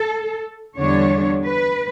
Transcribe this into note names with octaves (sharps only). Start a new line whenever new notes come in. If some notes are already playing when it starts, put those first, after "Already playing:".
Already playing: A4
E2 D3 G3 D4 C#5
B4